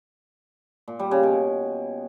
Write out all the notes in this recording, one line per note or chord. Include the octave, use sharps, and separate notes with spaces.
A#2
G3
C#3
B2